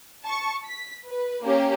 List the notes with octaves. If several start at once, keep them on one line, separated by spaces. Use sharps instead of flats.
A5 C#6
B6
B4
A#3 C#4 G4